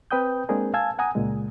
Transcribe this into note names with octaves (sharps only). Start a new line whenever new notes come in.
C4 B4 G5 D#6 G6
G#3 A#3 C4 D4 G#4 A#4
F5 G#5 A5 E6 G#6
F#5 G#5 A#5 D#6
C#2 A#2 G#3